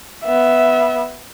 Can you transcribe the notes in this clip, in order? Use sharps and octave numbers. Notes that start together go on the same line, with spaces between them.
B3 E5